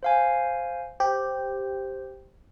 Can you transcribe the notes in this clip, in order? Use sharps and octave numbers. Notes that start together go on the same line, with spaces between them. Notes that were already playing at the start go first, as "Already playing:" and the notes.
C5 F5 G#5
G4 C5